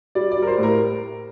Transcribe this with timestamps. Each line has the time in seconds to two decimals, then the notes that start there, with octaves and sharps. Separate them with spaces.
0.15 G3 D5
0.32 D5
0.37 G3
0.42 A#4
0.47 C5
0.58 A2 A#4